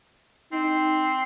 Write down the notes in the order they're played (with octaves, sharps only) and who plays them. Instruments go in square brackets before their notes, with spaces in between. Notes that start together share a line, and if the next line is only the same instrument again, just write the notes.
[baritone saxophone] C4 [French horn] D#4